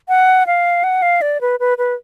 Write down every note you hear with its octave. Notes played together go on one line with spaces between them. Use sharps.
F#5
F5
F#5
F5
D5
B4
B4
B4